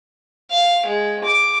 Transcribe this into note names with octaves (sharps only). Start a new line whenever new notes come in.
F5
G#3
D6